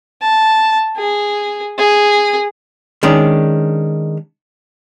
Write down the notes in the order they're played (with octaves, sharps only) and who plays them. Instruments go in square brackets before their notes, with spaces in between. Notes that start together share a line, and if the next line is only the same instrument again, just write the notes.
[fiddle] A5
G#4
G#4
[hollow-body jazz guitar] D#3 G#3 C#4 D4